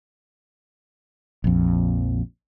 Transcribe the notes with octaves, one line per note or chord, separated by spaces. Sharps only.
A#1 F2